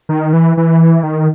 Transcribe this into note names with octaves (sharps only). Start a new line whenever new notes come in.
D#3
E3
E3
D#3